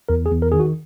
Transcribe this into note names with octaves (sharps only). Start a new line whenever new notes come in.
E2 A#4
G#4
E2
A#4
D#3 G#4
F#4